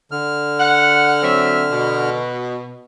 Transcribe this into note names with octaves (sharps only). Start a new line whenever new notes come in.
D3 F6
F#5
F#3 C4 E5
B2